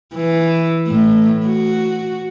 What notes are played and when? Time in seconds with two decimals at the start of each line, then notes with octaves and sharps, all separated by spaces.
0.16 E3
0.87 A2
1.47 F#4